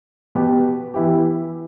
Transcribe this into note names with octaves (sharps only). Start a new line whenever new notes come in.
B2 B3 G4
E3 B3 E4 G4